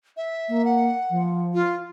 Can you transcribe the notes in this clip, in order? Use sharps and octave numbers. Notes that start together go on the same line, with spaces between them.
E5
A#3
F#5
F3
F4